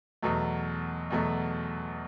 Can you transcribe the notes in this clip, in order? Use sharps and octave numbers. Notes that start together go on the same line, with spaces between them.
E2 B2 F#3 A3
E2 B2 F#3 A3